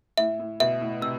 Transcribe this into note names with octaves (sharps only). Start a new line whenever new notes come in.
A2 E5
A2
B2 E5
A2
C3 E6